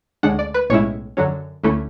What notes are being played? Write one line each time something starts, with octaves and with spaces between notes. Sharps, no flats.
D2 C#3 G#3 D4 F#5
D5
B4
B1 A2 G#3 C#4 E4 C#5
F#2 D3 F#3 C#4
D2 D3 A3 C#4 E4